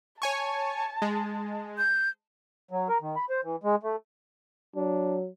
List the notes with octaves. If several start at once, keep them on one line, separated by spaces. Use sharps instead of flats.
C#5 G#5 A5 C#6
G#3
G6
F#3
A#4
D#3
B5
C5
E3
G#3
A3
F#3 D4